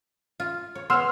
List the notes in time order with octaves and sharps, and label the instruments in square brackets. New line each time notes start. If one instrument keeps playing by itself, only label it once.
[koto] F4
C#5
[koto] B3 C#5 [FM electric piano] C6 E6 F6